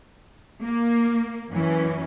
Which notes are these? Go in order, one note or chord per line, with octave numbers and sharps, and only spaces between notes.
A#3
F#2 E3 C#4